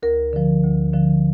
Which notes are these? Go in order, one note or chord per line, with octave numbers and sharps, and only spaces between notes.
D2 A#4
D3 F3
D2
D3 F3